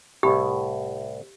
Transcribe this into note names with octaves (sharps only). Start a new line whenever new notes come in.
C2 A2 G4